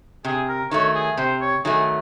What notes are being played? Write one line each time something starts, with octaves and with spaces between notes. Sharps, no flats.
C3 G#4
A#4
D#3 F#3 A3 C#5
G#4
C3 C5
C#5
D#3 F#3 A3 G#4